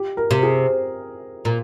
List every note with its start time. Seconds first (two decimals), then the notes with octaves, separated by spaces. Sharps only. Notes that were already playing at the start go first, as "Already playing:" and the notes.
Already playing: G4
0.17 A#4
0.31 C3
0.43 G#4
1.45 A#2